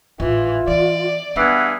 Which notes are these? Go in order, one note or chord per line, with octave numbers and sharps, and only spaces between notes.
G#1 A2 E3 F4
E3 D5
G2 E3 B3 E4 G#4 F#5